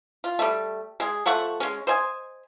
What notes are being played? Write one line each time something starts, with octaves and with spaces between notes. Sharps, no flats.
F4
G3 A3
G#3 G#4
F3 A3 F#5 C#6
G#3 C#4
C5 D#5 G#5